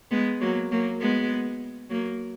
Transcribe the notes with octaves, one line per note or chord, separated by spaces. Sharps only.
G#3 B3
F#3 A#3
F#3 A#3
G#3 B3
F#3 A#3